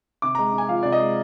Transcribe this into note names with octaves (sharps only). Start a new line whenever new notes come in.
C3 D6
G#3 A#5
C3 G#5
F3 F5
C3 D5
D#5
G#3